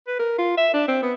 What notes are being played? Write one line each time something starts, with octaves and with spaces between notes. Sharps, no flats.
B4
A#4
F4
E5
D4
C4
B3